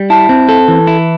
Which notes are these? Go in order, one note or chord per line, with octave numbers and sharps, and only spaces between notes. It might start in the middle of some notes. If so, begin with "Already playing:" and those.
Already playing: G3
E4 A5
C4
A4
E3
E4